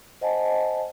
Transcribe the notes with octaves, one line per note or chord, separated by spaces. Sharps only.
C5 D#5 F#5 G#5 A5